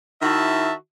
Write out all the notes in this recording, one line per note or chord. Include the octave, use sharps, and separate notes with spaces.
D#3 E4 F#4 E5 A5